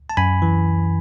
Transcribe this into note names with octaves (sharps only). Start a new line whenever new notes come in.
A5
F#2 G#5 B5
E3